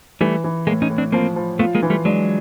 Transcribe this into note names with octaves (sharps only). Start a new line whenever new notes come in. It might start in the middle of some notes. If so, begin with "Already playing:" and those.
E3 G3 A3
E3
A2 G#3 A#3
C#4 D#4
A2
C4 D4
F3 A#3 C4
F3
A3 B3 F4
G#3 A#3
E3
G3 A3
F#3 G#3 D4